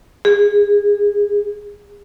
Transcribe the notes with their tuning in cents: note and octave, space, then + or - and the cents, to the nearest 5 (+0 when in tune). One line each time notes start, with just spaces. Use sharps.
G#4 -30